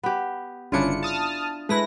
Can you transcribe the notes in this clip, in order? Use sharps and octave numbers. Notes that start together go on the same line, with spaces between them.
B3 G4
G1 C#3 D4 E4 F4 C#7
A5 D#6 F6
G#3 A3 E4 B4 A#6